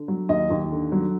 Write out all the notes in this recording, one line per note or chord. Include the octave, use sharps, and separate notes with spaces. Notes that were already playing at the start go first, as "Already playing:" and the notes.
Already playing: D3
F#3
D#2 D#5
D#2
D3
F#3